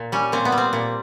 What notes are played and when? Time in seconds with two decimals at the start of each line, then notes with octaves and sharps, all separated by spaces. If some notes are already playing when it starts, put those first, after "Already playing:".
Already playing: A#2
0.12 G3 C#4
0.32 A#2 C4
0.45 B3
0.52 G3
0.58 C4
0.73 A#2